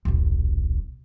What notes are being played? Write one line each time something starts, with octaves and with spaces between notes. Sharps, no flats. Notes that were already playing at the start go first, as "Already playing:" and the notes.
D#1 B1